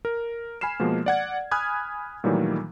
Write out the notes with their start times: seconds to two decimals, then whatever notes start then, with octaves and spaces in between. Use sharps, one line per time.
0.05 A#4
0.61 G#5 B5 F6 C7 E7
0.80 B2 F3 G#3 A#3
1.06 D5 F#5 G#6
1.51 G#5 B5 D#6 F6 F#6 G#6
2.24 A#2 D#3 E3 F#3 G3 A3